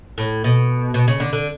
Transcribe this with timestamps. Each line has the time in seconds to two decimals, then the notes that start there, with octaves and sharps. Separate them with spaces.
0.18 A2
0.44 B2
0.94 B2
1.08 C#3
1.20 D3
1.33 D3